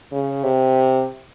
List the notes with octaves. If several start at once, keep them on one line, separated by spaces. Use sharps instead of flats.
C#3
C3